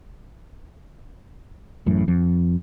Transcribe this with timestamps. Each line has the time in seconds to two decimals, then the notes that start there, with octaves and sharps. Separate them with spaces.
1.86 A1 F#2 A2
2.08 F2